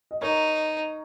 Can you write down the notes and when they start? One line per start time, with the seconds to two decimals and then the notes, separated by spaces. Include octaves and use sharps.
0.11 D#5
0.21 D#4 A#4 C#5